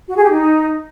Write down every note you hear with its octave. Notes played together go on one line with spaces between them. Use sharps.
F#4
G#4
G4
D#4